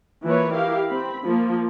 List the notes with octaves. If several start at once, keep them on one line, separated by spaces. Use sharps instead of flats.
E3 F3 A#3 B4 C#5
E4 G4 A#4 F5
C4 B5
F3 A#3